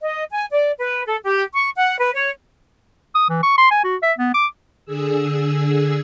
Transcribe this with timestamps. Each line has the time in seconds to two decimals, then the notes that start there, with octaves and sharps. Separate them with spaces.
0.01 D#5
0.30 G#5
0.51 D5
0.78 B4
1.05 A4
1.23 G4
1.54 C#6
1.76 F#5
1.98 B4
2.13 C#5
3.15 D#6
3.29 E3
3.43 C#6
3.58 C6
3.71 G#5
3.84 F#4
4.02 E5
4.18 B3
4.34 D6
4.85 D3 G#4 E6